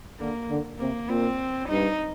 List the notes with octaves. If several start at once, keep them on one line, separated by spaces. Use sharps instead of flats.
D3 A#3
D3
C3 A#3
A#2 C4
G2 D#4